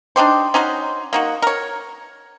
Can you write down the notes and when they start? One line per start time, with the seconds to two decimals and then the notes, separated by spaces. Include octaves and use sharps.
0.16 D4 D#4 G4 C5
0.54 C#4 D#4 F#4 C5
1.13 A#3 D#4 F#4
1.42 A#4 C#5